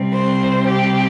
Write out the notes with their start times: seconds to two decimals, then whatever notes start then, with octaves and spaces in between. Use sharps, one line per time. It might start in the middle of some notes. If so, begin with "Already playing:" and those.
Already playing: C3 G3 C4
0.13 C5
0.68 G4